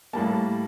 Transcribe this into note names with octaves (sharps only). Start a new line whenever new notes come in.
A2 G3 A#3 A5